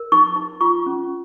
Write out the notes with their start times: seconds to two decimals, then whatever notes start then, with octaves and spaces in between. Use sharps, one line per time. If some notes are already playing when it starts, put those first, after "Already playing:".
Already playing: A#4
0.12 D#4 C#6
0.36 D#4
0.61 F4 C#6
0.86 C#4